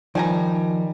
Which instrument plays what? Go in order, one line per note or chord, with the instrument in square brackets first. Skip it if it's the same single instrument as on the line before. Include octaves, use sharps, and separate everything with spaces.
[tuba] D#3 [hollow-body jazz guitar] F3 [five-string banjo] G3 G#5 A#5